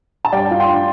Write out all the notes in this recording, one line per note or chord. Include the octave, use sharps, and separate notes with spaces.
A5
G2 D5 G5
F4
G5 C6